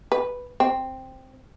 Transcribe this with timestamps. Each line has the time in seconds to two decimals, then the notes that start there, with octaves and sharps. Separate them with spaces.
0.12 B4
0.60 C4